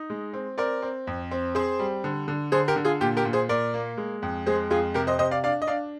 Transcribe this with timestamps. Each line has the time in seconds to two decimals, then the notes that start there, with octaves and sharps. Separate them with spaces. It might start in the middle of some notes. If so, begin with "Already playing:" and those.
Already playing: D#4
0.10 G#3
0.33 C4
0.58 C4 A#4 D5
0.82 C4
1.07 F2
1.31 C4
1.55 C4 G#4 C5
1.79 G3
2.04 D3
2.28 D3
2.52 D3 G#4 C5
2.68 G4 A#4
2.76 D3
2.85 F4 G#4
3.01 A#2 G4
3.17 G4 A#4
3.25 A#2
3.33 G#4 C5
3.49 A#2 A#4 D5
3.74 A#3
3.97 G#3
4.22 F2
4.46 G#3 G#4 C5
4.70 F2 F4 G#4
4.94 C3 G4 A#4
5.07 C5 D#5
5.19 C3 C5 D#5
5.31 D5 F5
5.44 D4 D5 F5
5.62 D#5
5.67 D4 D5 F5